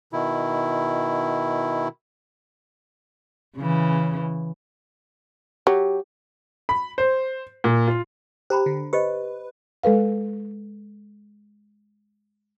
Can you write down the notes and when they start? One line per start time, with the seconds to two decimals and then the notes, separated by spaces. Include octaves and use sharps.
0.13 B2 D#3 E4
3.56 C#3 E3
5.67 F#3 G4
6.69 B5
6.98 C5
7.64 A#2
7.88 F4
8.50 G4 C5 A#5 B5
8.66 D3
8.93 G4 B4 C5 D#5
9.83 G#3 A4 B4 F5